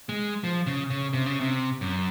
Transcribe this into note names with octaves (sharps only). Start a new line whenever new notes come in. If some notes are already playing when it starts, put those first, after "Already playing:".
G#3
F3
C#3
C#3
C3
C#3
C3
F#2